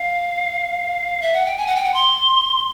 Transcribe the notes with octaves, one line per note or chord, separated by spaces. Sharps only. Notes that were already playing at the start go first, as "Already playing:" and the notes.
Already playing: F5
E5
F#5
G5
G#5
F#5
G5
F#5
C6